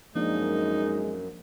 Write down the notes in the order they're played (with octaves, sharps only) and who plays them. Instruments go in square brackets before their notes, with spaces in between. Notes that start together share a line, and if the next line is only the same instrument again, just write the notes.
[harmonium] F#2 [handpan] F3 A#3 D4 [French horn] G#3 [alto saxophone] D#4